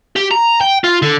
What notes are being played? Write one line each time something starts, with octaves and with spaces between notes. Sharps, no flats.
G4
A#5
G5
F4
D3